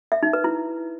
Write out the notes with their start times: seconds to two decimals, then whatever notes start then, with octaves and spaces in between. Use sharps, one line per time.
0.12 E5
0.23 D#4
0.33 B4
0.44 E4